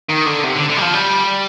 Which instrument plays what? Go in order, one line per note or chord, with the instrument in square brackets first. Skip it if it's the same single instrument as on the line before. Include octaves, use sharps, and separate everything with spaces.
[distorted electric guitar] D#3
D3
C3
D3
D3
G3
F3
G3